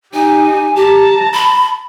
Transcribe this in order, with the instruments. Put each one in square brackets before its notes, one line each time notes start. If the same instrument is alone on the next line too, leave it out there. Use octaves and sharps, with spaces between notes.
[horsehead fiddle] D#4 G4 [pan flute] G#5
[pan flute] G4 [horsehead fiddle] A5 A#5
[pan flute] B5